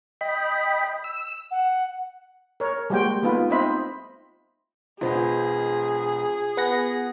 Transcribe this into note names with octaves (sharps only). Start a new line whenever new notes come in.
D#5 G5 B5
E6
F#5
A#4 C#5
G3 G#3 A#3 F#4 C5 G5
A3 B3 D#4 F4 B4
C4 D#4 C5 D#5 E5 B5
E1 B3 F4 G#4 C5 D#5
B3 F#5 B5 A#6